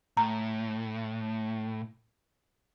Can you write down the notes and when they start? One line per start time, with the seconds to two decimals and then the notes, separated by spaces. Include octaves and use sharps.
0.17 A2 A#5